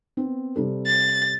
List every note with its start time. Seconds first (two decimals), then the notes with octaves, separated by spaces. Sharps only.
0.17 B3 C4
0.56 C3 G3 A4
0.86 A6